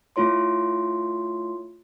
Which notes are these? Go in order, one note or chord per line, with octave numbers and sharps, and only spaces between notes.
A3 E4 F4 C#5 C6